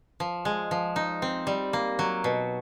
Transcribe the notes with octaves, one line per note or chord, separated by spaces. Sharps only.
F3
G#3
F3
D#4
C4
G3
A#3
F#3
B2